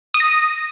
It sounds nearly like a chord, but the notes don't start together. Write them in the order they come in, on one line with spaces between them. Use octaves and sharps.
D#6 D#7 A#6